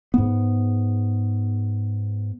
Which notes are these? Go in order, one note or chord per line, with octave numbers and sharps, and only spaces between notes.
G#2 B3